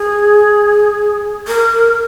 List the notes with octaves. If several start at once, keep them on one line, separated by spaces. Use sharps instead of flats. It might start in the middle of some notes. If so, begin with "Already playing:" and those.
Already playing: G#4
A#4